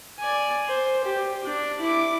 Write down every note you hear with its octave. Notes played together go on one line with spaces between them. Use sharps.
D5 G#5
C5
G4
D4
E4 D6